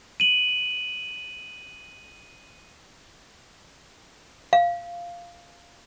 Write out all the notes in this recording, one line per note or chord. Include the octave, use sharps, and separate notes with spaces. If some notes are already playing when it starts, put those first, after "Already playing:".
D#7 F#7
F5